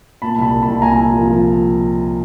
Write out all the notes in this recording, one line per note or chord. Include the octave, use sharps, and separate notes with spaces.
A#2 A5 B5
C2 A5 B5
C2
A5 B5
C2
A#2 G#5 A#5
C2
F3
F3